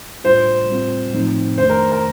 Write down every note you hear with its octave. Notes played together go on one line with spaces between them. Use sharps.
A2 G3 D4 F4 C5
A2 G3 C4 F4
A2 F3 C4 D#4
F2 D#3 A3 D4 C5
A#4
A#4